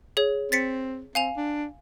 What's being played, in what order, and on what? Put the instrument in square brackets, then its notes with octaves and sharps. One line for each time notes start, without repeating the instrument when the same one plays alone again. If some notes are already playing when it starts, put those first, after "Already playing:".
[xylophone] G#4 C#5
[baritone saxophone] C4 [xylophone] A6 B6 C#7
[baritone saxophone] C4 [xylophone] F5 G#5 F7
[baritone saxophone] D4